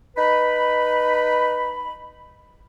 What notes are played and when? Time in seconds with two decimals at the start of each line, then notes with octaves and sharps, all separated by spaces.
0.16 D#4 B4 B5